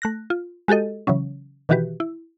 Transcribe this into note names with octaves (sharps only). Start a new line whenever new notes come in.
A3 F#6 A#6
F4
G#3 F#4 G4 A4 D#5
C#3 E3 F#3 C#4
B2 D#3 E3 F#4 G4 B4
E4